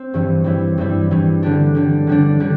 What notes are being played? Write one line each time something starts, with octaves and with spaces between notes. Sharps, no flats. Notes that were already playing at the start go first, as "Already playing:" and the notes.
Already playing: C4
G2 E3 G3 E4
G2 E3 G3 E4
G2 E3 G3 E4
G2 E3 G3 E4
D3 G3 D4
D3 G3 D4
D3 G3 D4
D3 G3 D4